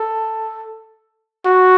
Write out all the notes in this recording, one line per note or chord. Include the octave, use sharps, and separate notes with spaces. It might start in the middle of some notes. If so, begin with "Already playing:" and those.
Already playing: A4
F#4